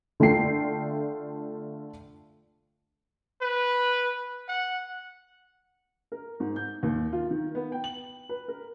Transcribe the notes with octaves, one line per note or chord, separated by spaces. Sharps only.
D3 A3 F4 G5 C7
B4
F#5
A#4
G#2
G6
D#2
F4
D#3
B3
G5
F#7
B4
A#4